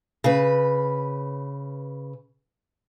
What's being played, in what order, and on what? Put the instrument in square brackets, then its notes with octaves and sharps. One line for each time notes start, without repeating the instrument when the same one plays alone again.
[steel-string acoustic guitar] C#3 B4